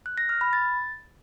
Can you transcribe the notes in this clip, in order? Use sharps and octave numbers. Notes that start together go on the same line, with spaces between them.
F#6
A#6
F6
B5
A6